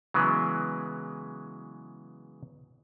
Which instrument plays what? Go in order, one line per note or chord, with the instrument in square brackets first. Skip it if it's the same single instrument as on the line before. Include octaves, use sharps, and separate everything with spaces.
[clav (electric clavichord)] C#3 E3 F#3 G#3 B3